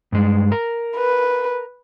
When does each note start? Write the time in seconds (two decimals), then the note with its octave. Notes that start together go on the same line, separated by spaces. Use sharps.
0.12 G2 G#3
0.52 A#4
0.97 B4